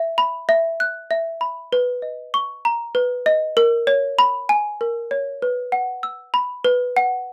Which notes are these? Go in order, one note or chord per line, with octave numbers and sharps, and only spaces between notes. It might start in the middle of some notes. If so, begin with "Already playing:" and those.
Already playing: E5
B5
E5
F#6
E5
B5
B4
D#5
C#6
A#5
B4
D#5
A#4
C#5
B5
G#5
A#4
C#5
B4
F#5
E6
B5
B4
F#5